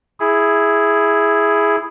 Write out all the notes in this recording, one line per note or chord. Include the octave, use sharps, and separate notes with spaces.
E4 G#4